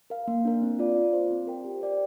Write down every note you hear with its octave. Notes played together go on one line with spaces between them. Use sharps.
A#4 F5
A#3
D4 A#4
C4
F4 D5 F5
F4
C5 F5
C4
A#4 G5
G4
A#4 D5 G5